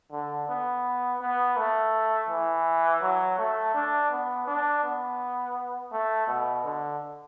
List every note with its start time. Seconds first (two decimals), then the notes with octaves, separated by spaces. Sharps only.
0.12 D3
0.49 B3
1.21 B3
1.57 A3
2.29 E3
3.02 F#3
3.38 A3
3.74 D4
4.11 B3
4.47 D4
4.83 B3
5.92 A3
6.28 B2
6.64 D3